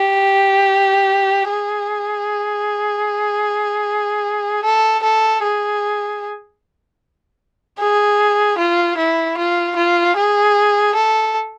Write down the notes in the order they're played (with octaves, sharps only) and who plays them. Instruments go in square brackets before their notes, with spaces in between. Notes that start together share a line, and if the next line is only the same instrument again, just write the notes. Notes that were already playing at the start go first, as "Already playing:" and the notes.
Already playing: [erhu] G4
G#4
A4
A4
G#4
G#4
F4
E4
F4
F4
G#4
A4